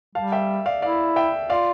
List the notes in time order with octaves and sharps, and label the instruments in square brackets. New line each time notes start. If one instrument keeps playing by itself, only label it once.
[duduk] G3 [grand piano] F5 A5
[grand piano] E5 G5
D5 F5
[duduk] E4 [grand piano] D5 F5
[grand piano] E5 G5
[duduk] F4 [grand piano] D5 F5